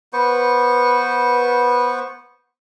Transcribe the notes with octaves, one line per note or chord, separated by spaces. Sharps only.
B3 B4 C5 C#6